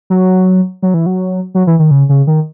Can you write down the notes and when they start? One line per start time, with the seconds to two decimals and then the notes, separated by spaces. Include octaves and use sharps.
0.10 F#3
0.83 F#3
0.94 E3
1.06 F#3
1.55 F#3
1.67 E3
1.79 D#3
1.91 C#3
2.09 C#3
2.27 D#3